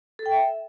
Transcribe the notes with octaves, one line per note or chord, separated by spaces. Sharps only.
A4
G5
E5